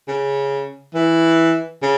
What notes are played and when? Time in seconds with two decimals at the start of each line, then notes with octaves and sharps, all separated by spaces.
0.08 C#3
0.95 E3
1.82 C#3